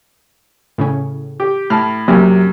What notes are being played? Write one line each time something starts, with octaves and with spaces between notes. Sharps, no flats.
A2 C#3 C#4
G4
A2 A5 F6
F#2 C3 A#3